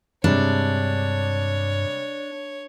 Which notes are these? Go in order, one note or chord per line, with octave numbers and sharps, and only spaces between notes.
G2 C3 G3 G#3 D4 C#5